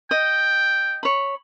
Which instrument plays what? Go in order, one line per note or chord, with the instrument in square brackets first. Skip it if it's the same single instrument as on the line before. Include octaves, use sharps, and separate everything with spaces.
[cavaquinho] D#5 [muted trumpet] G5
[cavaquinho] C#5 B5